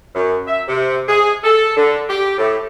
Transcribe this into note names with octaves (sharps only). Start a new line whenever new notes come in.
F#2
E5
C3
G#4
A4
D3
G4
A2